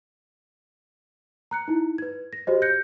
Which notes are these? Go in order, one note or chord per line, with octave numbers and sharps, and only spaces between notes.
A#5 F#6 C#7
D#4 E4
B4 G#6
A#6
F#4 G4 C5 D#5
F#6 G6 A#6 C#7